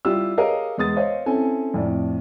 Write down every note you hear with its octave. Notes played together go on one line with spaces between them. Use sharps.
G3 E4 F4 G4 E6
G4 G#4 A#4 C#5 D#5 F5
E2 G#3 D#6 A6
C5 C#5 D#5 F5
C4 C#4 E4 A4 G#5
F2 A2 D5